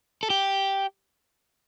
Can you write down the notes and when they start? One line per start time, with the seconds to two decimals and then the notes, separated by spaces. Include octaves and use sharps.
0.23 A4
0.30 G4